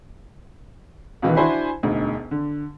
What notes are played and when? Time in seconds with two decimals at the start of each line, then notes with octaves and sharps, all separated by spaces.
1.22 C#2 B2 D#3 E3
1.36 D4 E4 F#4 C5 G#5 B5
1.83 E1 D2 D#4
2.31 D3